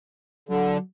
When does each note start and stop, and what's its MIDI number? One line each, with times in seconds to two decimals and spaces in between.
0.49 0.78 50
0.49 0.79 54